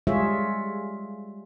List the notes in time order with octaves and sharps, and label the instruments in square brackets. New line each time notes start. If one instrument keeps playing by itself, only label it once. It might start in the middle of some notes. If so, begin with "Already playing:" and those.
[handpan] G3 G#3 F4 G#4 C#5 E5